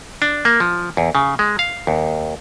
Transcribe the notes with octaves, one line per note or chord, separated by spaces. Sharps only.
D4
A#3
F3
E2
C#3
G#3
F5
D#2